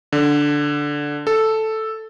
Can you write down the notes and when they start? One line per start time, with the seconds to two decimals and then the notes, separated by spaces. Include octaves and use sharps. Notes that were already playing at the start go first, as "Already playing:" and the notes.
0.12 D3
1.27 A4